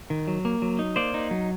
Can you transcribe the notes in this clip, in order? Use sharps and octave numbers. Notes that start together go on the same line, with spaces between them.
D#3
F#3
A#3
F#3
D#4
A#3 C5 D5
D#4
F#3